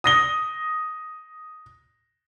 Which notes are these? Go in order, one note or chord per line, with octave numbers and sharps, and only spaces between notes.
D#6 A#6 G7